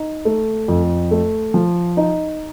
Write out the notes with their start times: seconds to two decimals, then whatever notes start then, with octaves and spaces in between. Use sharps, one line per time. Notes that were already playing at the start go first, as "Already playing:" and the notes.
Already playing: D#4
0.25 A3
0.68 F2
1.11 A3
1.54 F3
1.97 D#4